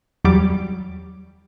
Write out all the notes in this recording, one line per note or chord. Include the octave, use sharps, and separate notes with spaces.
E2 F#3 G3 D6